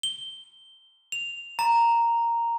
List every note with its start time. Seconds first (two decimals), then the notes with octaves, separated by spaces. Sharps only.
0.03 G7
1.12 F7
1.59 A#5